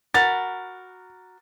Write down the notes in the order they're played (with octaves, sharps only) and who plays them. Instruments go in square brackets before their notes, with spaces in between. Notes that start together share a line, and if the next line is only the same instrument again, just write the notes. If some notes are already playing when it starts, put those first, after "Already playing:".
[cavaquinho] F#4 A#4 B5 [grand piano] A6